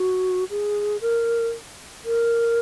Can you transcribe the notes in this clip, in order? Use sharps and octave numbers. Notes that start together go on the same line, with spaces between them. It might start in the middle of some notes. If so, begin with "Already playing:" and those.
Already playing: F#4
G#4
A#4
A#4